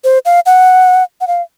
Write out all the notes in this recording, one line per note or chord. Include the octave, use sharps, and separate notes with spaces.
C5
F5
F#5
F#5
F5